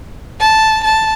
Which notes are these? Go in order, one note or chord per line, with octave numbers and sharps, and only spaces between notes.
A5
A5